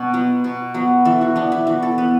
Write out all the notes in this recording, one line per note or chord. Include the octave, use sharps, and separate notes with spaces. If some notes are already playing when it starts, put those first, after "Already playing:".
Already playing: B2 F#4
F#3 B3
B2
F#3 B3
E3 A4
F#4
B3 D4
E4
E3 F#4
A4
B3 B4